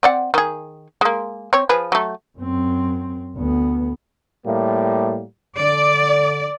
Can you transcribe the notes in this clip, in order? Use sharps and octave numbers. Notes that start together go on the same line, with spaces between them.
C4 D5 F#5
D#3 G#4
G#3 A#3
C4 C#5
F3 G#4 B4
F#3 A3
F#2 C4
D2 B3
A2 G3 A#3
D3 D5